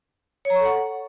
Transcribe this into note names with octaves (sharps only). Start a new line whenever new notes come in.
C#5
A#5
C#6
A4
F#5